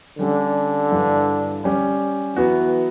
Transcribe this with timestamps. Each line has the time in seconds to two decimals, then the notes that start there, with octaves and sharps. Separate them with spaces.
0.19 D3 G3 C#4 G4
0.91 G2 E3 G3
1.64 G3 C#4 G4 D5
2.36 E3 F#3 B3 F#4